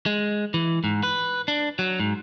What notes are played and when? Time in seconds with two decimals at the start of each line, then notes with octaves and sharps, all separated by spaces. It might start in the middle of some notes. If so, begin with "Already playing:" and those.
0.06 G#3
0.54 E3
0.84 G#2
1.03 B4
1.48 D4
1.79 F#3
2.00 G#2